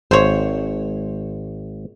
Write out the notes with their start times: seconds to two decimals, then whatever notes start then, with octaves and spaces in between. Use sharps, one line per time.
0.11 G#1 C5 C#5